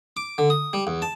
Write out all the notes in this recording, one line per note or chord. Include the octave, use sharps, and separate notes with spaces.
D6
D3
D#6
G3
E2
A5